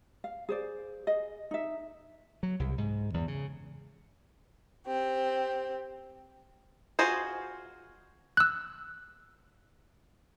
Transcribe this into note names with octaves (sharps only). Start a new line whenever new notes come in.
F5
G#4 C5 D5
G#4 D#5
D#4 E5
F#3
C2
G#2
E2
C#3
C4 G4
F4 F#4 G#4 C5
E6 F#6